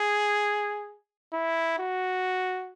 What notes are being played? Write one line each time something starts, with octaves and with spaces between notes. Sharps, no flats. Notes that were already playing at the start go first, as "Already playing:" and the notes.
Already playing: G#4
E4
F#4